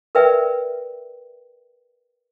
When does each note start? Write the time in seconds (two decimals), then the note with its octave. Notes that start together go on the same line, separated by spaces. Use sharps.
0.15 A#4 B4 D5 E5 G5